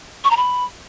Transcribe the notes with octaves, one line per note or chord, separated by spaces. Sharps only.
C#6
A#5
B5